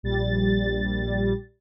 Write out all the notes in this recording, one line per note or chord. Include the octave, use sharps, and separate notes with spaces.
A#1 G3 A6